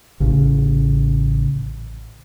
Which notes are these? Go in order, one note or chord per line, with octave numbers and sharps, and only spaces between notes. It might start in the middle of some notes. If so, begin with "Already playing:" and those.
A1 C#3